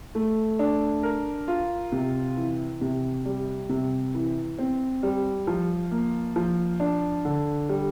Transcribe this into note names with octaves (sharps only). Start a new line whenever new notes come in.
A3
D4
A#4
F4
C3
E3
C3
G3
C3
E3
C4
G3
F3
A#3
F3
D4
D3
G3